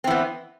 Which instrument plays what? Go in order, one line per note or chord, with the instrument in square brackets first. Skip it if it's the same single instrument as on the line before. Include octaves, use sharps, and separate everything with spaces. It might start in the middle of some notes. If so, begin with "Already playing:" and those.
[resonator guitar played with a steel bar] C4
E3
B3